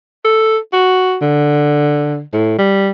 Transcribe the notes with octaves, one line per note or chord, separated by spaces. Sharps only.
A4
F#4
D3
A2
G3